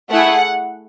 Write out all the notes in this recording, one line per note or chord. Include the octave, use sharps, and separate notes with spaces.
A3 E4 G#4 F#5